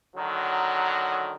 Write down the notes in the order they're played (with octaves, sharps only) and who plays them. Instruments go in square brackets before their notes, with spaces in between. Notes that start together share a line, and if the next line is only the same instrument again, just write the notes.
[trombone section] D3 D#3 F#3